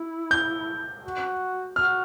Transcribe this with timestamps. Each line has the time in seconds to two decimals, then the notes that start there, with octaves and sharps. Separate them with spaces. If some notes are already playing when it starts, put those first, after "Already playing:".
Already playing: E4
0.31 G6
1.03 F#4
1.75 F#4 F6